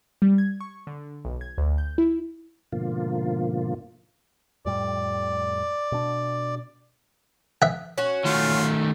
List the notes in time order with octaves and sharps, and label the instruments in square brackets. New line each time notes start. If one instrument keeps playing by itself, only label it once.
[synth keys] G3
G#6
C#6
D3
B1
G#6
D2
G6
E4
[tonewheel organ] G#2 B2 D3 F3 A#3 F4
[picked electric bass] F2 A2 G3 [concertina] D5
[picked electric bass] B2 D4
[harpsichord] E5 F#5
[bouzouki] C#4 F#4
[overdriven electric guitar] D#3 A3 [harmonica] F4